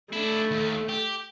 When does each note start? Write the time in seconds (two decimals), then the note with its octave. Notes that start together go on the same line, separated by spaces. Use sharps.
0.13 A3 D4 E4
0.51 D#2
0.89 G4